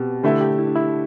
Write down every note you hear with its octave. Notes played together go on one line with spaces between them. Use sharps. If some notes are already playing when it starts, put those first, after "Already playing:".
Already playing: B2 B3 C4 G4
D3 A3 E4 G4
G4
E4
D4
E4